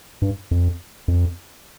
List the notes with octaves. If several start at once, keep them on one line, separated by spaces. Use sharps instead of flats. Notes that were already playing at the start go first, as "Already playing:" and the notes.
G2
F2
F2